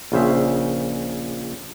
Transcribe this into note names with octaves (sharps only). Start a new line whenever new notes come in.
A#1 C#3 C5 E5